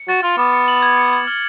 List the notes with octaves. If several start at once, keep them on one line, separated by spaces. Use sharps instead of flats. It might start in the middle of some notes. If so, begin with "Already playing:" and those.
Already playing: C#7
F#4 A6
F4 F6
B3 D6
C#7
F#7
G#6
C#7
G#6
F6